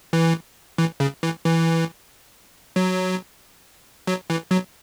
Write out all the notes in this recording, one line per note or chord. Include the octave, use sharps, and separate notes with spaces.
E3
E3
C#3
E3
E3
F#3
F#3
E3
F#3